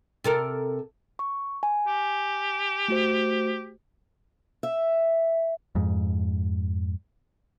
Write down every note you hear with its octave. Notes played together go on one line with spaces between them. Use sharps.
C3 A4 A#4
C#6
G#5
G4
A3 F#4 C5
E5
F2 G#2